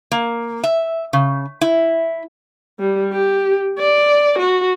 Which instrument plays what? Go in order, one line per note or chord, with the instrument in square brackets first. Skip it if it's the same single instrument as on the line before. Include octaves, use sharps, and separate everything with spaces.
[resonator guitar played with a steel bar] A#3
E5
C#3
E4
[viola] G3
G4
D5
F#4